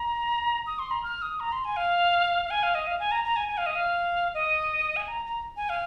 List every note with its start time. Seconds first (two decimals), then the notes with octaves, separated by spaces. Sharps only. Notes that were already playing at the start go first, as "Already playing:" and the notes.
Already playing: A#5
0.67 D#6
0.79 C6
0.91 A#5
1.03 F6
1.22 D#6
1.40 A#5
1.52 C6
1.65 G#5
1.77 F5
2.45 F5
2.50 G#5
2.63 F5
2.75 D#5
2.87 F5
3.00 G#5
3.12 A#5
3.24 A#5
3.36 G#5
3.49 G#5
3.57 F5
3.66 D#5
3.75 F5
4.34 D#5
4.97 G#5
5.08 A#5
5.26 A#5
5.57 G#5
5.69 F5